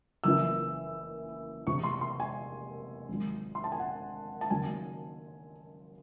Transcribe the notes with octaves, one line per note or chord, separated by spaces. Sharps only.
F#1 F#2 C#3 E3 E6
F#1 E2 C3 E3 C#6
C6
C6
G#5
G#1 G#2 F#3
C6
A5
G#5
F#5
A5
D#2 C#3 F#3 G#5